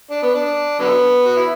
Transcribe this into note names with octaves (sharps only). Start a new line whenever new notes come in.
D4
B3
D4
D3 F#3 B3
F#4
E4